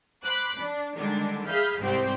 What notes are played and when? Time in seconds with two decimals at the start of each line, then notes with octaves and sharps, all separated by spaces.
0.25 C5 B5 D6 F#6
0.58 D4
0.97 D3 D#3 G3 G#3 D4
1.48 G#4 E5 F5 B5 F6 G6
1.82 C2 G#2 C4 G4 C5 G5